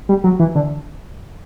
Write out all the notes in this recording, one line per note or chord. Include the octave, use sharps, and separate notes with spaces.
G3
F#3
E3
D3